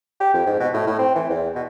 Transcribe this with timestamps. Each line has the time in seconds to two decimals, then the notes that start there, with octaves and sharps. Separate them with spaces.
0.20 G4
0.34 F2
0.46 G#2
0.60 B2
0.74 A2
0.87 A2
0.99 C4
1.16 E3
1.30 E2
1.55 B2